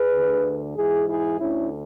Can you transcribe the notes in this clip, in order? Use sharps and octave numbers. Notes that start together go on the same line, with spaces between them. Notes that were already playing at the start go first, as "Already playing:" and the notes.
Already playing: G#4 B4
D2 D3
G#2 E3 E4 G#4
E4 G#4
D2 D3 C#4 E4